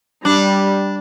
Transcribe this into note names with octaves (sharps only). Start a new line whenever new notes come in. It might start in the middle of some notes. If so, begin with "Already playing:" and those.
G3 D4